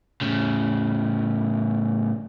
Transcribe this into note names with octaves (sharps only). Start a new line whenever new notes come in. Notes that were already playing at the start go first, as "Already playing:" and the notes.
A2 C#3